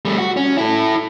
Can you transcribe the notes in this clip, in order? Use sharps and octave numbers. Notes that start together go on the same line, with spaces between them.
G3 A3
F#4
C#4
E4 A4